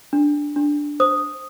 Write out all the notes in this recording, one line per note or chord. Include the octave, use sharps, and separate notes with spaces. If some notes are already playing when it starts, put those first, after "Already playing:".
D4
D4
C5 D#6